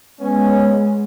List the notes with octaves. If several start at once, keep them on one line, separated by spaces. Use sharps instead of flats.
G#3 B3 C#4